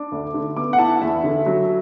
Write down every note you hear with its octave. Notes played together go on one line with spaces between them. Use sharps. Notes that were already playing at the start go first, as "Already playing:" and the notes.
Already playing: D4 D6
D2
D3
B3 D6
F#5
E4 A5
E2 E5
D3
F#3